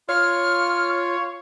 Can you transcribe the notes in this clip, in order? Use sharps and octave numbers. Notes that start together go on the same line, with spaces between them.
F4 C#5 F6